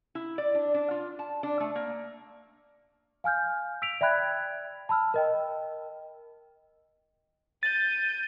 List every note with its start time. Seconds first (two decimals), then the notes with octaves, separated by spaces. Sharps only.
0.15 E4
0.38 D5
0.55 D4
0.74 D4
0.91 F4
1.19 A5
1.43 D4
1.60 A3
1.76 A#3
3.24 F5 G#5 F6 G6
3.82 E6 B6 D7 F7
4.01 D5 E5 G5 B5 F#6 G#6
4.89 A5 B5 E6 F6
5.14 A#4 D#5 G5
7.63 G6 A6 D#7